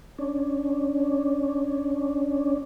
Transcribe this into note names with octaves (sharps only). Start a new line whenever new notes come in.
C#4 D4